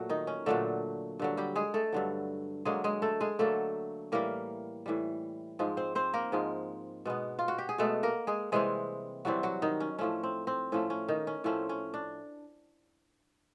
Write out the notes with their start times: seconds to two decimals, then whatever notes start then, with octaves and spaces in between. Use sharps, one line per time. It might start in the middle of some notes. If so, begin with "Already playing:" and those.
Already playing: A#2 F#3 A3 F#4
0.10 D#3 D#4
0.27 C#4
0.46 A#2 D3 F#3 A3 D4
1.19 G2 D3 F#3
1.37 G3 G4
1.56 G#3 G#4
1.74 A3 A4
1.93 G2 D3 F#3
2.65 D3 F#3 G#3 A#3 G#4
2.84 G#3 G#4
3.02 A3 A4
3.21 G#3 G#4
3.39 D3 F#3 A3 A#3 A4
4.12 A2 E3 G3 A#3 A#4
4.86 A2 E3 G3
5.59 G#2 F3 G#3
5.77 C4 C5
5.95 C4 C5
6.14 A#3 A#4
6.32 G#2 F3 G#3
7.05 B2 G#3 B3
7.39 F4
7.48 F#4
7.58 G4
7.69 G#4
7.78 B2 G#3 A3 B3 A4
8.03 A#3 A#4
8.27 G#3 G#4
8.52 C3 E3 G3 G#3 C4 G#4
9.25 C3 E3 F#3 G3 C4 F#4
9.43 F#3 F#4
9.62 D#3 D#4
9.80 C#4
9.99 A2 F3 A3 C#4
10.23 C4
10.47 C4
10.72 A2 F3 A3 C#4
10.90 C#4
11.08 D#3 D#4
11.27 C#4
11.44 A2 F3 A3 C4 C#4
11.69 C#4
11.94 D4